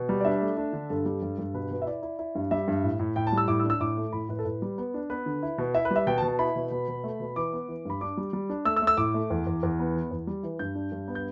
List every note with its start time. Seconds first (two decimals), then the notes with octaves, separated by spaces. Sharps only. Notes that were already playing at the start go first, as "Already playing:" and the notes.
Already playing: B2
0.09 G3
0.21 D5
0.25 D4 E5
0.41 A3
0.57 D4
0.73 D3
0.90 G2 A4
1.06 G3
1.22 G2
1.38 G2
1.54 B2 B4
1.71 B2
1.82 E5
1.86 E4 D5
2.03 E4
2.19 E4
2.35 G2
2.51 G3 E5
2.68 G2
2.83 A2
2.99 A2
3.16 A2 G5
3.27 A5
3.33 G3
3.38 E6
3.48 A2 D6
3.60 E6
3.64 D4
3.70 E6
3.80 A2 D6
3.97 A3
4.13 A2 B5
4.29 A2 B4
4.39 A4
4.45 A2 B4
4.62 G3
4.78 B3
4.94 D4
5.10 B3 B4
5.26 D3
5.43 E4
5.58 B2
5.74 E4 E5
5.85 B4
5.91 G3
5.96 E5
6.07 B2 G5
6.18 A5
6.22 B2
6.28 A5
6.39 E4 B5
6.56 B2
6.71 B2
6.88 B2
7.04 A3
7.20 B2
7.36 E3 D6
7.53 B3
7.68 E3
7.85 G2 B5
8.01 D4 D6
8.17 G3
8.33 G3
8.50 D4
8.65 A3 E6
8.76 E6
8.82 A3
8.87 E6
8.97 A2 D6
9.14 A3
9.30 E2
9.47 E2
9.63 E2
9.79 B3
9.95 E3
10.11 E2
10.27 G3
10.43 E3
10.59 G2 G6
10.75 D4
10.92 G2
11.08 B3
11.15 G6